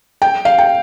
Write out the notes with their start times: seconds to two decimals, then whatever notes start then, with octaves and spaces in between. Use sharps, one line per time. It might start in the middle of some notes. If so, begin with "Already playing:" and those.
0.22 G5
0.45 F5
0.59 G5